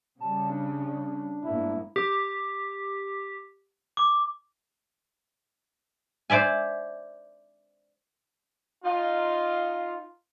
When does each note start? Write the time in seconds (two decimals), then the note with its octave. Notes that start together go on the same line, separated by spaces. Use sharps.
0.20 C#3 G3 C#4 A5
0.50 D4
1.44 G1 G#2 A#3 E4
1.96 G4
3.97 D6
6.30 C5 D5 E5 G#5
8.84 D#4 F4